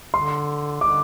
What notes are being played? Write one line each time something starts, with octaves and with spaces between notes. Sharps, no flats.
D3 C6
D3 D6